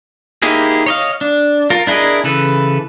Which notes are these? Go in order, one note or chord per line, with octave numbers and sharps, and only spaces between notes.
A#3 D#4 E4 G4 G#4
C#5 D#5 F5
D4
F4 A#4
D4 E4 G#4 A#4 D#5
C#3 E3 A4 B4